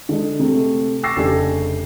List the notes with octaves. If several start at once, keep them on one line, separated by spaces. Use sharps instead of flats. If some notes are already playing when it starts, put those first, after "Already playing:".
D3 G#3
C3 A3
C#6 D6 E6 A6 A#6 C7
F1 C#3 D4 G4 A4 G#5